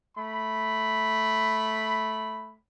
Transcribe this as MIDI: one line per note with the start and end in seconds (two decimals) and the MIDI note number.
0.17 2.58 57
0.17 2.58 83